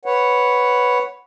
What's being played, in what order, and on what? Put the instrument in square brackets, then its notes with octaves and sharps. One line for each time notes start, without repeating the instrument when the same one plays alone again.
[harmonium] B4 C#5 F#5